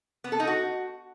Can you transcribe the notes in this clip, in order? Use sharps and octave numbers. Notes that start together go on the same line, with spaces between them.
B3
A4
D#4
F#4